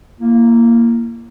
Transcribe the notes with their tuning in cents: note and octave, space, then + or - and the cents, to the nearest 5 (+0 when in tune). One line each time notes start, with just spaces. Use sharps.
A#3 +0 E4 +40